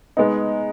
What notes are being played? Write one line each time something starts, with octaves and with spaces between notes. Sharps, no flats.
G#3 B3 D#4